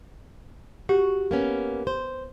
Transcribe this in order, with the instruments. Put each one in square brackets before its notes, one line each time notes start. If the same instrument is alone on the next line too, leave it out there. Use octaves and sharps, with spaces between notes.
[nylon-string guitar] F#4 [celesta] G4
[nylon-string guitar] A#3 B3 C#4
C5